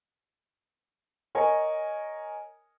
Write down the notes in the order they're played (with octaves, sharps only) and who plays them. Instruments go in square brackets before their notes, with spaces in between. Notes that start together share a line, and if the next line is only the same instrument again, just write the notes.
[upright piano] A#4 C#5 D#5 G#5